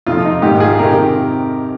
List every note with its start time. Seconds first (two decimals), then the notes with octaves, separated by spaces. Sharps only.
0.06 F2 C3 F3 F4
0.25 D#4
0.42 G#2 D#3 D#4 G4
0.60 F4 G#4
0.79 F2 C3 D#3 G4 A#4